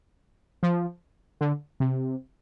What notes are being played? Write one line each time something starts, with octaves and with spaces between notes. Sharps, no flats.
F3
D3
C3